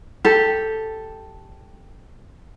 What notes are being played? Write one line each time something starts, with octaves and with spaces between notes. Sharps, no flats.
G4 A4